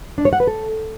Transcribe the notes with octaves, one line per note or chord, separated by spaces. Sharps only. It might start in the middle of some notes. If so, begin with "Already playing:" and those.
D4
C#5
F#5
B4
A4